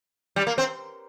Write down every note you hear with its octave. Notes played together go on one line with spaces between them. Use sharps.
G3
A#3
C4